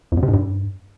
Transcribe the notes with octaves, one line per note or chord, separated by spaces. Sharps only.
F2
F#2
C3
G#2
G2